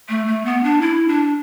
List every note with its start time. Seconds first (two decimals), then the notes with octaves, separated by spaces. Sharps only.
0.09 A3
0.27 A3
0.45 B3
0.63 D4
0.81 E4
1.08 D4